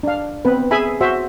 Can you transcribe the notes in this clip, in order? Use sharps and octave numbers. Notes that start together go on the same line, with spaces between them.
D4 F5
B3 C4 B4
G#4 E5 G#5 B5
F#4 C5 E5